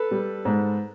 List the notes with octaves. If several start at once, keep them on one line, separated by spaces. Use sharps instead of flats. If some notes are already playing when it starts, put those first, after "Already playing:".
Already playing: A4 B4
G3
G#2